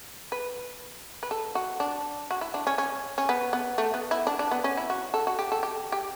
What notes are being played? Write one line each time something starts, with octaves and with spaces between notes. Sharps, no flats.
B4
B4
A4
F#4
D4
F#4
E4
D4
C#4
C#4
C#4
B3
B3
A3
B3
E4
D4
D4
B3
C#4
E4
F#4
A4
F#4
G4
A4
G4
G4